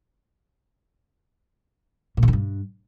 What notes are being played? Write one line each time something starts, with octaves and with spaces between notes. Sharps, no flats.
A#2
C#3
D3
G2